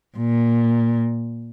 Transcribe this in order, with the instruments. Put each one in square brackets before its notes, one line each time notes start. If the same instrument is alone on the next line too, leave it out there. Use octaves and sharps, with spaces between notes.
[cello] A#2